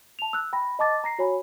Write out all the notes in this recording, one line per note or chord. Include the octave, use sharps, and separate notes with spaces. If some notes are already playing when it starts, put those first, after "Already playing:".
A5 F7
E6 F#6
G5 B5 A#6
D#5 A5 D6 A6
A#5 A#6 C7
F#4 C#5 G#5 B5